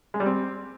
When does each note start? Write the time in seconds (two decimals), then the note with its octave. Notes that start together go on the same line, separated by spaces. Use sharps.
0.14 G#3
0.20 G3
0.26 C4